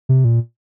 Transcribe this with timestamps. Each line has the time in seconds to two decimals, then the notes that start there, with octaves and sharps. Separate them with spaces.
0.09 C3
0.25 A#2